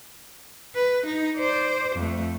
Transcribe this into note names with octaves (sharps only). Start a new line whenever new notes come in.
B4
D#4
C5 D5
F2 A3